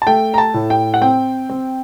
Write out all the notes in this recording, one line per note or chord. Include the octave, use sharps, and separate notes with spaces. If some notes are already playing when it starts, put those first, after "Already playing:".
A5
A3 G5
A#5
A5
A2
G5
F#5
C4 G5
C4